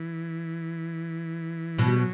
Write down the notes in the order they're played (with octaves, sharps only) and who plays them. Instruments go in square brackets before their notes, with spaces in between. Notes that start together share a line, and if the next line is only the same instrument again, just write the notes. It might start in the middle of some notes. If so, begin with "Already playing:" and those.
Already playing: [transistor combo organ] E3
[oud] B2 [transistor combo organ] F#3
[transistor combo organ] G3
F#3